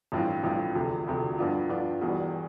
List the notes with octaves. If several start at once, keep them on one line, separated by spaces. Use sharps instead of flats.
A1 G2 F3 C4 F4
A1 G2 F3 C4 F4
E1 D2 C3 F3
E1 D2 C3 F3
G2 F3 B3 D4 F4
G2 F3 B3 D4 F4
E1 E2 B2 G3 B3